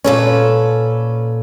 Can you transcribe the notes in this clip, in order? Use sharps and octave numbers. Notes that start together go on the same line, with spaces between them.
A#2 C#4 A4 B4